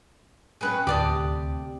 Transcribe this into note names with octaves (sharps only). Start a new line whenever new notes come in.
F#3 C4 C#4 G#4 B4 F#5
D2 A2 C3 G4 D5 A5 D#6